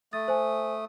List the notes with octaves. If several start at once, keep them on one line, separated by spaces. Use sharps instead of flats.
A3 D#6 A6
C5 G#5